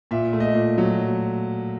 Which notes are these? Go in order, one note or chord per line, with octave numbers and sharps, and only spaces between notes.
A#2 E5
A3
D#5
A#2
F#3